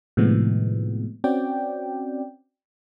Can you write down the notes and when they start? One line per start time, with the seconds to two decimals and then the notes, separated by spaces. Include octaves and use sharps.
0.17 A2 C3 D#3 F3 G#3 B3
1.24 C4 C#4 F#4 D5 G5